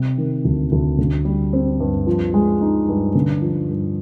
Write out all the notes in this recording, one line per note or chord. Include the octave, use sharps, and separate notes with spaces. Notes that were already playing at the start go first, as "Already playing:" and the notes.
Already playing: C3
D#3
D2
D2
D3
G3
C4
G2
F3
G#3
D#4
G2
D3
F3
G2